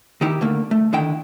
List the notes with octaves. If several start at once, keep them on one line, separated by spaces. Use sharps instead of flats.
D#3 D#4 E4 G4
D3 A3 A#3
A3
D3 D#3 E4 G5